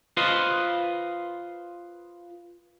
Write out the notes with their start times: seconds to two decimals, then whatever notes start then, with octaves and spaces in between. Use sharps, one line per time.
0.17 F4 B4 C5 D#5